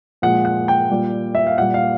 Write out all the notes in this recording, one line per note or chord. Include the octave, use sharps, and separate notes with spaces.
A#2 F3 G#3 F#5
F#5
G5
A#2 G3
E5
F5
A#2 G3 F#5
F5